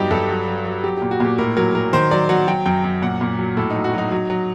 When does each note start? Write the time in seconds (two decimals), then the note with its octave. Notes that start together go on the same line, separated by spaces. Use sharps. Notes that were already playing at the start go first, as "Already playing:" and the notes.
Already playing: G2 F#3 D#4 G4
0.11 G2 A4
0.29 F#3
0.47 F#3
0.66 F#3
0.84 F#3 G4
0.97 G4
1.02 A#2
1.11 F#4
1.20 A#2 G4
1.38 A2 A#4
1.57 F#3 A#4
1.75 F#3 A#4
1.93 D#3 C5
2.11 F#3 D5
2.29 F#3 F#5
2.48 F#3 G5
2.66 F#2 G5
2.84 F#2
3.02 A#2 F#5
3.21 A#2
3.39 F#3
3.57 A2 A4
3.70 D#4
3.75 F#3
3.84 F#4
3.93 F#3 D#4
4.11 F#3
4.30 F#3